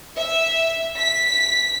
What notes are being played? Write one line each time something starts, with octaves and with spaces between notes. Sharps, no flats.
E5
B6